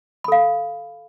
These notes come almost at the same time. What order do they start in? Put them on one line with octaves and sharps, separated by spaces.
B5 A4 F5